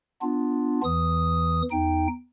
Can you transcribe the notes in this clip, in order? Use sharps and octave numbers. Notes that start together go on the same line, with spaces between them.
B3 D4 F4
E2 E3 D#6
E2 D#4 G5